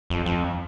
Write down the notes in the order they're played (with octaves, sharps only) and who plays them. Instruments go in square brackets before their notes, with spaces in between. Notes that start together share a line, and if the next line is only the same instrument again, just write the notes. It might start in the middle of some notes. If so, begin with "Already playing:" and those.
[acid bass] F2
F2